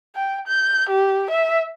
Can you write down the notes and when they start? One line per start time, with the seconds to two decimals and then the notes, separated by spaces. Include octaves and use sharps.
0.15 G5
0.47 G6
0.89 G4
1.31 E5